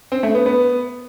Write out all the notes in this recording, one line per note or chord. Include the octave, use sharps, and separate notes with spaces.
C4
A3
B3
B3